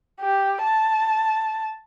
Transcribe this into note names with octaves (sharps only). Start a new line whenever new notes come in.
G4
A5